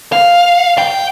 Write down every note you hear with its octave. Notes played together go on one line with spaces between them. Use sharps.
F5
G5